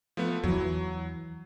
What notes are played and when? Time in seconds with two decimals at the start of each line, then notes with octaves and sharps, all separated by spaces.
0.17 F3 A3 B3
0.44 E2 E3 F#3